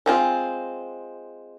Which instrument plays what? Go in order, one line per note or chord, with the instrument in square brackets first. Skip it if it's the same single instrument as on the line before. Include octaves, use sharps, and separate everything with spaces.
[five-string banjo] G#3 C4 F4